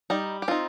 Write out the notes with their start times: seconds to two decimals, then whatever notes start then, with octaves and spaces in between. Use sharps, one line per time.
0.10 G3 D#4
0.42 G4
0.48 C4 D#4 F4